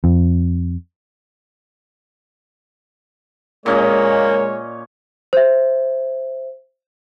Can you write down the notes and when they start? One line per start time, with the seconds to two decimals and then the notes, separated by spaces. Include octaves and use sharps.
0.04 F2
3.66 A#2 G#3 A#3 C#4 C#5 D#5
5.33 C5 E5